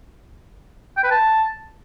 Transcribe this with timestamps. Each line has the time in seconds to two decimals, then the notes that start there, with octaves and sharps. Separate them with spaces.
0.97 G5
1.04 B4
1.11 A5